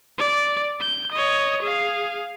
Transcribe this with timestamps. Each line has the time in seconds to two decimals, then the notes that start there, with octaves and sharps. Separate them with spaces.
0.18 D5
0.81 G6
1.12 C#5 D#5
1.62 G#4 F5